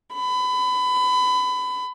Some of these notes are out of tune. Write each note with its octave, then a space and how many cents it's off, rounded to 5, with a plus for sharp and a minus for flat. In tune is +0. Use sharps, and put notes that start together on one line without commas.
B5 +25